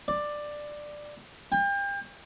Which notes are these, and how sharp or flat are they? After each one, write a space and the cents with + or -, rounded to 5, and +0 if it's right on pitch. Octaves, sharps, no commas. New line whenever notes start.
D5 +10
G5 +35